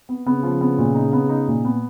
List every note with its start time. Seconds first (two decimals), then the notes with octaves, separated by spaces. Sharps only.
0.09 B3
0.27 C#3 B3
0.43 F3
0.61 B3
0.78 A#2
0.95 D#4
1.13 B3
1.29 D#4
1.48 A#2
1.65 B3